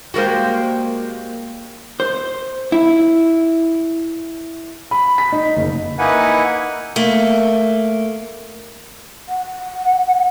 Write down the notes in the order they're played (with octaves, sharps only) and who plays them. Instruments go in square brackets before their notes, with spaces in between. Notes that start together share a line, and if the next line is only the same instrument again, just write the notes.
[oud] G3 G#3 A#3 [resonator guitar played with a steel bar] F#4 A#4 C5
[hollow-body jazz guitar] C5
E4
[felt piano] B5
B6
D#4
F#1
[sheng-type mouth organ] A#3 D#4 E4 B4 F#5 G#5
[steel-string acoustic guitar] A3 A#3
[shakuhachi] F#5